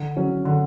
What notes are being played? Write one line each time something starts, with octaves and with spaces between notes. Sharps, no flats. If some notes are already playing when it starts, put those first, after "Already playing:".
Already playing: D3
F#3 C#4
D3